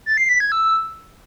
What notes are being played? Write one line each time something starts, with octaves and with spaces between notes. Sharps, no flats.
A6
C7
B6
G#6
E6